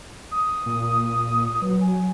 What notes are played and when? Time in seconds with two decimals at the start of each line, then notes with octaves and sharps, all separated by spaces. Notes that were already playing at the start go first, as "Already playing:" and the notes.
0.31 D#6
0.66 A#2
1.61 F#3 B4
1.81 G#5